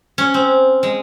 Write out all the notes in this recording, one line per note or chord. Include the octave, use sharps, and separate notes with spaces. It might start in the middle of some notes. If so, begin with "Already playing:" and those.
C#4
C4
G#3